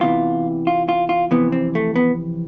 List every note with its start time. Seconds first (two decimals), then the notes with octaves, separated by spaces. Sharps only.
0.01 E2 C3 E3 F4
0.67 F4
0.89 F4
1.09 F4
1.31 F2 C3 E3 B3
1.52 C4
1.75 A3
1.96 B3